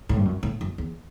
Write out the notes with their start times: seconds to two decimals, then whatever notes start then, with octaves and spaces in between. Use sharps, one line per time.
0.09 A2
0.17 G2
0.25 F#2
0.43 A2
0.61 F#2
0.78 E2